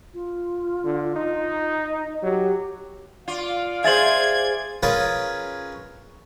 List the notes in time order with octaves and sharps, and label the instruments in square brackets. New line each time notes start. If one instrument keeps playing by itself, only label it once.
[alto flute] F4
[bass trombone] D3
D#4
[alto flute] D#5
[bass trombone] F#3 [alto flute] G4
[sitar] F4 [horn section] D5 F5
[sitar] G#4 C5 [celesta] E5 A6 F#7 [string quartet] G#6
[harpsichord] C#4 F4 G#4 A#4 B4